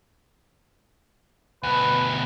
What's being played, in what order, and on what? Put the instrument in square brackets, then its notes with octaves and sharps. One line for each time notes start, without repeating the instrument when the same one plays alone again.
[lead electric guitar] D2 B2 [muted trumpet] B4